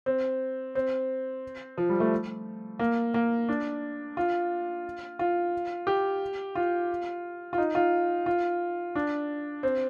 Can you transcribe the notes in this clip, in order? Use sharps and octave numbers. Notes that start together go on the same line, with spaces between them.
C4
C4
F3
G3
A3
A#3
A#3
D4
F4
F4
G4
F4
F4
D#4
F4
F4
D4
C4